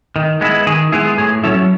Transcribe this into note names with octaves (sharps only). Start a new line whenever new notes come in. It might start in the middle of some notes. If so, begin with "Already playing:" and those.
D#3
G#3 B3 E4
D#3 G#4
G#3 B3 E4 G#4
G#4
A2 G#4
F#3 C#4 E4 A4